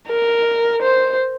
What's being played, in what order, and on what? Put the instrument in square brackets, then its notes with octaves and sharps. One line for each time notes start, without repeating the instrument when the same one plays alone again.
[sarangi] A#4
C5